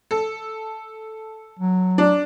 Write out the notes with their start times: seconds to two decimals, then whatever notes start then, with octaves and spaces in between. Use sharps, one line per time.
0.11 A4
1.59 F#3
1.98 D4